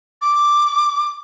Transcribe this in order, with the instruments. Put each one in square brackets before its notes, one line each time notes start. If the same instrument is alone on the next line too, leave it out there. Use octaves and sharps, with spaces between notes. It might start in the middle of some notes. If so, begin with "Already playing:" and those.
[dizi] D6